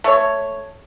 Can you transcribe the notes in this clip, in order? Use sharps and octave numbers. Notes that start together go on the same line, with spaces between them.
A3 C#5